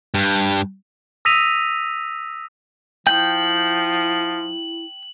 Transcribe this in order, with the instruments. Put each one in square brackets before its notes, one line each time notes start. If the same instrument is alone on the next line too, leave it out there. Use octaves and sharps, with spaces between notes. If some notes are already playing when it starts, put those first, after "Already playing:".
[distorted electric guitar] G2
[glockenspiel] D#6 E6 A#6 B6 D#7 F7
[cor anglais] F3 [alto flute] E4 [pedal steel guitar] G5 G6 [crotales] F#7